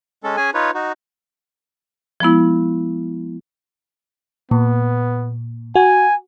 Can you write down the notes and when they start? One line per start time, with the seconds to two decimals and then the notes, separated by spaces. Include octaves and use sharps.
0.24 G#3 C#4 A4
0.37 C#4 G#4 G#5
0.54 D#4 F4 B4 C#5
0.74 D#4 F#4
2.20 F3 G#3 B3 E4
4.51 A#2 B3
5.76 F#4 G#5